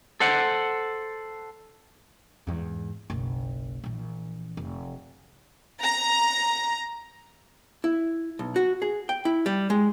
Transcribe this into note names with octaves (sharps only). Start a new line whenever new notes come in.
A4 C5 F#5
E2 G#2
F#1 B1
A#1 E3
F1
A#5
E4
B1
F#4
G#4
G5
E4
G3
G#3